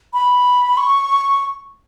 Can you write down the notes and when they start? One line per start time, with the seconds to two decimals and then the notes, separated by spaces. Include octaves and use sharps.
0.14 B5
0.77 C#6